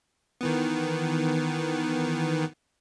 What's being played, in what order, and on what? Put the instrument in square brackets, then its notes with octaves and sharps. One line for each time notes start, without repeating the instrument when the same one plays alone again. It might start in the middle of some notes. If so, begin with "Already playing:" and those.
[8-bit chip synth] D#3 E3 B3